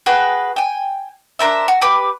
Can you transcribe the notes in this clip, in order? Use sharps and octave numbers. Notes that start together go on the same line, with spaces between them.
F#4 G#4 B4 G5
G5 G#5
D4 A#4 C5 E5
F#4
G4 B4 B5 D6